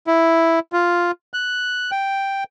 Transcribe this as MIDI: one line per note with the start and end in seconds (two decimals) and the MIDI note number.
0.07 0.59 64
0.73 1.11 65
1.34 1.91 90
1.91 2.44 79